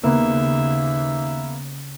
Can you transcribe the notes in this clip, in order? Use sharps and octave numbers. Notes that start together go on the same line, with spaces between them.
D#2 C#3 A#3 B3 E5